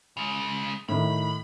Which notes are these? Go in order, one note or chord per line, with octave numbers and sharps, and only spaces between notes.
C#3 G#3
A2 D#3 B5